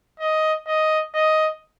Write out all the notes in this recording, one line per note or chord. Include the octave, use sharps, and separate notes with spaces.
D#5
D#5
D#5